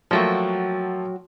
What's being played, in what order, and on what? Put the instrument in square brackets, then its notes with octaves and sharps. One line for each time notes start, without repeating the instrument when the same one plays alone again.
[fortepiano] F3 A3 A#3 [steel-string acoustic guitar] F#3 F#4 G5